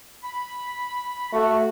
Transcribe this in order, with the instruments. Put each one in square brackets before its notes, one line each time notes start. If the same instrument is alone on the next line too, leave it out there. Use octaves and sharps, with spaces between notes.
[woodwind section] B5
[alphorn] A3 [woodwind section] F#4